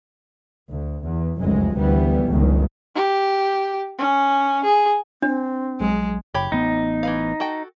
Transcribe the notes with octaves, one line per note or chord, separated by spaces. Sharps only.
D2
E2
F1 C#2 F#2 G#3
D2 E3 G3 B3
G1 C#2 F#2 D#3
G4
C#4
G#4
C4 D4
A#1 F#3 G#3
F#1 G4 C#5 B5
A1 B3 D#4
E3 B4 F5
F#4 A4 G5